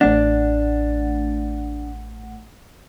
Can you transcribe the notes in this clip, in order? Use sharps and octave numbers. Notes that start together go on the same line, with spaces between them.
A1 A3 D4 F#5